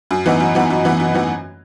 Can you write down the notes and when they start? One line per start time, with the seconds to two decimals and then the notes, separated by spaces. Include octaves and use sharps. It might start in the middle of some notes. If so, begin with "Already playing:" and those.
0.11 F#2
0.26 E3 B3 D#4 F#4
0.40 F#2
0.55 E3 B3 D#4 F#4
0.70 F#2
0.85 E3 B3 D#4 F#4
1.00 F#2
1.14 E3 B3 D#4 F#4